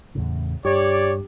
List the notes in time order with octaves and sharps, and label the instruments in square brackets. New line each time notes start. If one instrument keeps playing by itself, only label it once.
[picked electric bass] E2 A2 C#3
[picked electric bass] G2 [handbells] G4 [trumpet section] C#5 D5